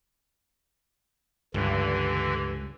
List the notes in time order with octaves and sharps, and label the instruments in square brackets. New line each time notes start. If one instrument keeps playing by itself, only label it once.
[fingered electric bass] C#2 [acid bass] G2 [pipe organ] D3 E3